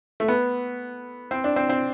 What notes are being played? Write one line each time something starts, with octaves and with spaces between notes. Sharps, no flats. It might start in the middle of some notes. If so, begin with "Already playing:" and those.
A3
B3
C4
D4
C4
C4